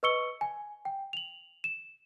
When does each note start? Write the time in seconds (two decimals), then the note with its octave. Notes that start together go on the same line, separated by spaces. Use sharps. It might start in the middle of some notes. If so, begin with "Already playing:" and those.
0.03 B4 D#5 C#6 E6 C#7 G7
0.41 G#5
0.85 G5
1.13 F7 F#7
1.64 E7